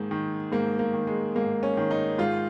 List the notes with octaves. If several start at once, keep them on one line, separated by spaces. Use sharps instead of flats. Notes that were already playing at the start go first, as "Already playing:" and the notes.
Already playing: G#2 D#3 A#3
D#3
G#2 A#3
A#3
D#3
G#3
G#2 A#3
C#4
D#3
D#4
G#2 F4